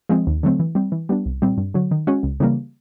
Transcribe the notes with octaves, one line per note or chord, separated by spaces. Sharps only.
F3 G#3 C4
D#2
D3 F#3 A3 C4
E3
G3 C4
E3
G3 B3 D4
C2
A#2 G3 C4
G2
D3 F#3
D#3
G#3 C#4 F#4
C#2
C#3 E3 G3 A#3